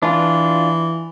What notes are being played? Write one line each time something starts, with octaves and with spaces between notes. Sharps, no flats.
E3 D4 F4